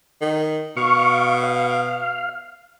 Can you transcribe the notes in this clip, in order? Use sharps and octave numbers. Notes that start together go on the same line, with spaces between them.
D#3
B2 F5 C#6
F5